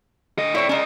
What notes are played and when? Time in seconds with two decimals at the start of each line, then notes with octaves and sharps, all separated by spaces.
0.38 D3 D#5
0.55 D3 C4 E4 C#5
0.69 C#4 D4 E4 A#4 D#5